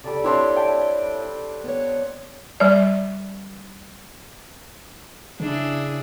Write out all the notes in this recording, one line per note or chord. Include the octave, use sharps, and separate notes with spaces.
C#3 G3 A4 D5
C4 D4 E4 C5 C#5 E5
G5 A5
B3 C#5
G3 D5
C#3 D4 E4 G#4